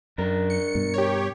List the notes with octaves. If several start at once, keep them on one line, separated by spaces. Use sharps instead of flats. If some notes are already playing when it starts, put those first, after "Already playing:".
F#2 D4 A#4
C#7
G2 B2
G4 C#5